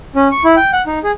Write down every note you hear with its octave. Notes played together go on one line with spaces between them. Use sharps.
C#4
C#6
E4
G5
F#5
D#4
G#4